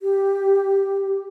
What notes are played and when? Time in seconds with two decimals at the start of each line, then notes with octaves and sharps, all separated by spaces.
0.01 G4